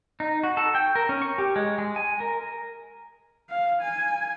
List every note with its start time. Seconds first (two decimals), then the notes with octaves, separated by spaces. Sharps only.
0.20 D#4
0.43 F#4
0.57 A4
0.75 G5
0.96 A#4
1.09 C#4
1.22 C#6
1.38 G4
1.56 G#3
1.78 G#3
1.96 G#5
2.20 A#4
3.50 F5
3.81 G#5